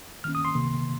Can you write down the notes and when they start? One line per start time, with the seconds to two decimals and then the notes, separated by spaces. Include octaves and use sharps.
0.24 D#3 A#3 C#4 F6
0.35 D#6
0.45 C6
0.55 C3 D#3 A#3